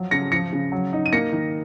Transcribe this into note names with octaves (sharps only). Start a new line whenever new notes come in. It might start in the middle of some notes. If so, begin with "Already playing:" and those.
Already playing: F3 F#3
C#3 A#6 C#7
F3 A#6 C#7
C#3
F#3
D#4
D#7
A#3 A#6 C#7
D#3